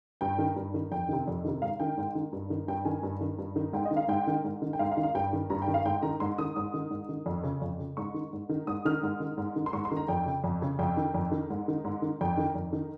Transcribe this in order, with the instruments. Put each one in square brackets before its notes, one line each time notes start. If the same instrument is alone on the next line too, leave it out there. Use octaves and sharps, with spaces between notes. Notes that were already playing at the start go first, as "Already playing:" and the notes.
[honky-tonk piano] G2 G5
D#3
G2
D#3
F2 G5
C3 D#3
F2
C3 D#3
G#2 F5
D#3 G5
G#2
D#3
G2
D#3
G2 G5
D#3 G#5
G2
D#3
G2
D#3
G#2 G5
D#5
D#3
F5
G#2 G5
D#3
G#2
D#3
G5
G#2 F5
F5
D#3
F5
G2 G5
D#3
G2 A#5
G5
D#3
F5
G#2 G5
D#3 A#5
G#2 C6
D#3 D#6
G#2 D#6
D#3
G#2
D#3
F2
C#3
F2
C#3
G#2 C#6
D#3
G#2
D#3
G#2 D#6
D#3 F6
G#2
D#3
G#2
D#3
C6
G#2 C#6
C6
D#3
A#5
F2 G5
C#3
F2
C#3
F2 G5
D#3
F2
D#3
G#2
D#3
G#2
D#3
F2 G5
D#3
F2
D#3